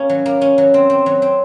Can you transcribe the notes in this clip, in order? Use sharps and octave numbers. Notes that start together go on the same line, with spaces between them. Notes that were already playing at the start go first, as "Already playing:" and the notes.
Already playing: A#3 C#4
F#3
A#3
C#4
F#3
C4
C4
F#3
C4